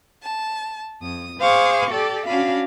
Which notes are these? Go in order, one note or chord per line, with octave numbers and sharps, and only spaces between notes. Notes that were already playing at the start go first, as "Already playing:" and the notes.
A5
F2 D#6
G#4 C5 F5 C#6 D6
G4 A4 D5
C#4 D4 F#4 F5 B5